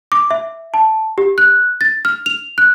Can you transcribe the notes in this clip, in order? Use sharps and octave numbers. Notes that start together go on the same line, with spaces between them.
D6
E5
A5
G4
F#6
A6
F6
F7
F#6